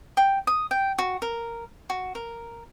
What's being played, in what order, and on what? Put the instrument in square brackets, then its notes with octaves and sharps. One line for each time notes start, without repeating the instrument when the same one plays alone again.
[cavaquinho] G5
D#6
G5
F#4
A#4
F#4
A#4